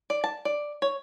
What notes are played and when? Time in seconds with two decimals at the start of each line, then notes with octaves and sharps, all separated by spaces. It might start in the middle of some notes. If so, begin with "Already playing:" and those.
0.10 D5
0.24 A5
0.45 D5
0.82 C#5